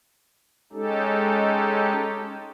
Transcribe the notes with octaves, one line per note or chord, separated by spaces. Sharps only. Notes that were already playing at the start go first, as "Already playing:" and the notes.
G#3 C#4 D#4 G4 A4